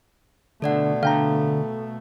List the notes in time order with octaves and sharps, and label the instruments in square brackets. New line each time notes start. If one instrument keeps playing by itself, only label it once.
[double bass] B2 A3 [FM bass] D3 [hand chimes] A4 D5 F#5
[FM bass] D3 [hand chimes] A4 [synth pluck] F5 G5 A#5